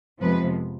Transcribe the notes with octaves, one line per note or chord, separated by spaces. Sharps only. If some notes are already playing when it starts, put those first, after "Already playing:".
F2 C3 F3 G#3 B3 B4